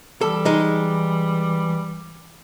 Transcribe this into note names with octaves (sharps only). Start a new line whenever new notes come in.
E3 G3 A4
G#3 D#4